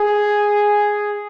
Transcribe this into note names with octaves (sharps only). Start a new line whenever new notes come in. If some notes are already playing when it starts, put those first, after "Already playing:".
Already playing: G#4